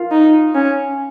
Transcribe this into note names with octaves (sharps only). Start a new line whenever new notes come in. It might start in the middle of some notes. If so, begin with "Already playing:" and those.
Already playing: F4 A#4 F5
D#4
C#4